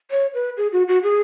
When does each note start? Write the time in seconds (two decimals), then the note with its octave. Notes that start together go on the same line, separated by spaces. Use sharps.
0.11 C#5
0.34 B4
0.57 G#4
0.72 F#4
0.88 F#4
1.03 G#4